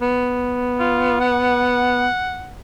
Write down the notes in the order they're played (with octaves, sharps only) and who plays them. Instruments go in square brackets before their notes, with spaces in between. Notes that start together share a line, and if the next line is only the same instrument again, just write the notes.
[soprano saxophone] B3
[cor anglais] F4
F#5